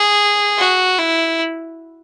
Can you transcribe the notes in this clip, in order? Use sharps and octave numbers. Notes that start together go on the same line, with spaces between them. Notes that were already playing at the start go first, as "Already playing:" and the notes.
Already playing: G#4
F#4
E4